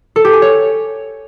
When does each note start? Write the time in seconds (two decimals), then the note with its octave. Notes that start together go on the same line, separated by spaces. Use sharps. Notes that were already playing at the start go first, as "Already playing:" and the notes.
0.16 A4
0.25 G4
0.33 G#5
0.42 C#5